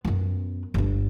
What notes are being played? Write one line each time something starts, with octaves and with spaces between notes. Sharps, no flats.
F#2 B3
G1 G2